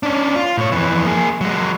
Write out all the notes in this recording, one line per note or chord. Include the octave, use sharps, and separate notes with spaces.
C#4 D4
F4
A2 C#5
F2 E3
A#3 G#4
F#3 G#3